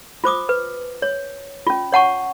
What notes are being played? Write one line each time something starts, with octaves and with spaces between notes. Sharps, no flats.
F4 C5 D6 D#6
B4
C#5
C#4 F4
C#5 F#5 A5 C#6